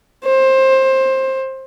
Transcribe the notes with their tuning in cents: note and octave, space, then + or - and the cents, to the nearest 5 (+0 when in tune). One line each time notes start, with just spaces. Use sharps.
C5 +20